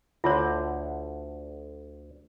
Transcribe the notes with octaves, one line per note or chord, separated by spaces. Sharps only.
D2 D3 F4 C#5